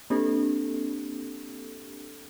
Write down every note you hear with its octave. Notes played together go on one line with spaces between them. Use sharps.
A#3 C4 D4 G4 A4